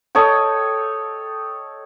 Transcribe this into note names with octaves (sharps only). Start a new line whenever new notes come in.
A4 C#5 D#5 G5